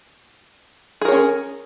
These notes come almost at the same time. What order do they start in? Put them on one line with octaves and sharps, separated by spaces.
G#4 A#4 C#5 C#4